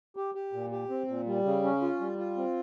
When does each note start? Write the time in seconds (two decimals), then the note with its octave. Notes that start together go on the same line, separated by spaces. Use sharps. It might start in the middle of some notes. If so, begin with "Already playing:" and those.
0.16 G4
0.35 G4
0.53 A#2
0.71 G4
0.90 C4
1.08 A#2
1.26 G3
1.45 C#3
1.63 C#4
1.82 F4
2.00 G3
2.18 F4
2.37 C4